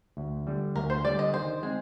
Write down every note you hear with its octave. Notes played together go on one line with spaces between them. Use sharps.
D2
D3 G3
D2 A#4
C5
D3 G3 D5
D#5
D#3 C5
G#3 C4 G#4